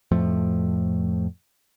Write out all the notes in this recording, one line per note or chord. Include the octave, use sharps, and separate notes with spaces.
F2 A2 F3 A3